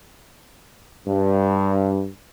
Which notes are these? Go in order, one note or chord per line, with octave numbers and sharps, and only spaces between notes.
G2